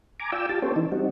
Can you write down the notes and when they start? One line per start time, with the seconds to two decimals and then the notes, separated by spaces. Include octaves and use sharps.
0.20 G#5 A#5 D6
0.32 F4 D5 G5 E6
0.49 F4 G4 A5
0.62 B3 C#4 G4 A4 C5 C#5
0.76 E3 D#4
0.92 G3 C4 D#4 F#4